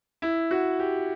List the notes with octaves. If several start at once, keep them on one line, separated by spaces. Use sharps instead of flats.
E4
F#4
G4